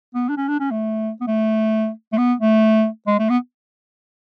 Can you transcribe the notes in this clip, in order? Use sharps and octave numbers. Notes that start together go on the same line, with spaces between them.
B3
D4
C#4
D4
C#4
A3
B3
A3
A3
B3
A3
G#3
A3
B3